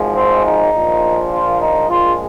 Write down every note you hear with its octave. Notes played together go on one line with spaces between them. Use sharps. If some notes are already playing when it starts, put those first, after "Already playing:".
Already playing: G#1 G#2 F3 G#3
C4
D#4
A#1 A#2 F3
F4
D#4
A#1 A#2 F3 G#3 F4